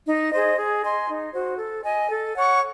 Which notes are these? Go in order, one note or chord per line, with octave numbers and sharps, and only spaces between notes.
D#4
G#4 C5 D#5
G#4
D#5 G#5 C6
D#4
F#4 C5
A4
D#5 G#5
A4
C#5 F#5 C#6